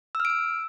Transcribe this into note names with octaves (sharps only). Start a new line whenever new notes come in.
E6
F6
D7
E6